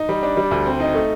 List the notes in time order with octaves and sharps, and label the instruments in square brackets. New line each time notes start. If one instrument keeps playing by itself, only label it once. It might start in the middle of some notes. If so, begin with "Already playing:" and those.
Already playing: [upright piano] D#4
G3
D4
G3
D2
C4
D#4
A3